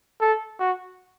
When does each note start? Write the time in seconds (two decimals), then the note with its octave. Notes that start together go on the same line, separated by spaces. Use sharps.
0.21 A4
0.60 F#4